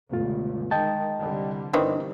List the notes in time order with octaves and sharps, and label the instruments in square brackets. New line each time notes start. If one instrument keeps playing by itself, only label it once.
[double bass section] G1 C#2 [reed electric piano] B2 A3 F4
[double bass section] D#3 G#3 [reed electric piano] D#5 G5 A5
[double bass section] C2 D3 G3
[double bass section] G1 G3 [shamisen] D#3 E3 C4 [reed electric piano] D4 D#5